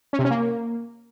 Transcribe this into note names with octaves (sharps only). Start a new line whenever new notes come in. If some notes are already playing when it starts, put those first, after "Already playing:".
C#4
C3
C#4
A#3